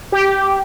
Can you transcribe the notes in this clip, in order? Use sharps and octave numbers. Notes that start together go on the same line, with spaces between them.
G4